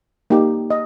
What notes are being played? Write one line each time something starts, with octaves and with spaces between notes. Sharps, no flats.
A#3 D#4 G4
D#5